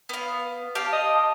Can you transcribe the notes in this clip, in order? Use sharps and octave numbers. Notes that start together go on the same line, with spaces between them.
B3 F5
G4 F5 A5
D#5